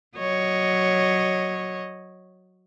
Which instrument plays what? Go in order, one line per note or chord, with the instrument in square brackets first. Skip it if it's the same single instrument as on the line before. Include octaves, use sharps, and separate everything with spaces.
[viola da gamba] F#3 C#5 D#5